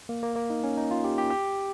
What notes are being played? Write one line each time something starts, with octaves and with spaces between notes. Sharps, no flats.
A#3
A#3
A#3
D#4
C#4
D#4
F4
G4
G4
G4